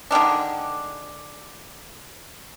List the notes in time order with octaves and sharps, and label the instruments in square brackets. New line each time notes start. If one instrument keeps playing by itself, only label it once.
[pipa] D3 D#3 G#3 D4